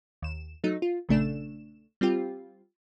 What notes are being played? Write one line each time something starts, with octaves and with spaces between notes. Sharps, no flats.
D#2 E7
F#3 A3 D#4
F4
A#1 C#3 A3 D4 E7
G3 C4 F4 G4